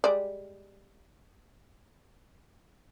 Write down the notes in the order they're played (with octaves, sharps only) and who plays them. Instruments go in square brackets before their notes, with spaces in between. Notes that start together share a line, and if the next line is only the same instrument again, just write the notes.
[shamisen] G3 G#3 D5